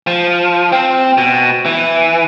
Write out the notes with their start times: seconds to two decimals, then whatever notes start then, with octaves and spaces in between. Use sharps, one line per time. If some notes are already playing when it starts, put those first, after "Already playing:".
0.07 F3
0.72 C4
1.18 B2
1.66 E3